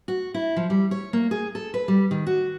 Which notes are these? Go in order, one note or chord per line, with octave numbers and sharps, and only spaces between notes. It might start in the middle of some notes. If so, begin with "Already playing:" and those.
F#4
E4
F3
G3
C#5
A#3
G#4
A4
B4
G3
D#3
F#4